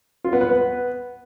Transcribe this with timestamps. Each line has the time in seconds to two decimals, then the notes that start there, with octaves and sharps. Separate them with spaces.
0.24 F4
0.33 B3
0.41 B4
0.49 B3